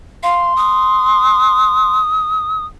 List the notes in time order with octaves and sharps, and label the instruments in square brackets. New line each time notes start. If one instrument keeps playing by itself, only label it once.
[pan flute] F5 [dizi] C6
[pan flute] D#6